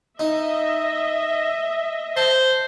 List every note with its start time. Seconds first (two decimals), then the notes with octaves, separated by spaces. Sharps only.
0.19 D#4 D#5 E5
2.17 C5 A5